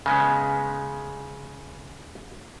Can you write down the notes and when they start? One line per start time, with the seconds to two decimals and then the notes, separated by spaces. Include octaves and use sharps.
0.06 C#3 G#3 B3